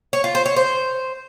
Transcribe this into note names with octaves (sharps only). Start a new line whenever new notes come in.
C#5
F4
C5
C#5
C5